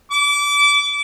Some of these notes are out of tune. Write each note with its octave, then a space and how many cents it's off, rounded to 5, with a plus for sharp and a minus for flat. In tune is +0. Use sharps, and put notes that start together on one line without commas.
D6 -25